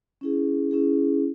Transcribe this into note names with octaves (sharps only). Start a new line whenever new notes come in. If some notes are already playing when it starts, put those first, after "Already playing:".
C#4 E4 G#4
C#4 E4 G#4